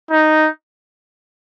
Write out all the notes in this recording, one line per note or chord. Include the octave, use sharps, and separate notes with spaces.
D#4